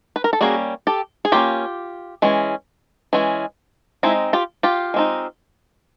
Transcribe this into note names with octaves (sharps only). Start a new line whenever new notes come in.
B4
A#4
A4
G3 A#3 C#4 F#4 G#4
G4 A4
G#4
G3 A#3 C#4 F4 G4
E3 G#3 C#4
E3 G#3 C#4
G#3 C4 D#4 E4
F4 G4
F4 G4
G#3 C4 D#4